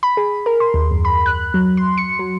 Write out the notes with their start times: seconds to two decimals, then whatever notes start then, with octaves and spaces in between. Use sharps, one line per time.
0.03 B5
0.17 G#4
0.46 A#4
0.60 C6
0.74 D#2
0.91 F#2
1.05 B5
1.26 F#6
1.54 F#3
1.77 C6
1.98 C#7
2.19 F#3